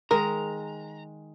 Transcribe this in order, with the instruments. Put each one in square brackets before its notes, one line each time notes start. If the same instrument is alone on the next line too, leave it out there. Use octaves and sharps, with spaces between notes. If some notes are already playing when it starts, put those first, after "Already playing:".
[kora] D#3 G#3 [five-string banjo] A#4 [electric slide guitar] A#5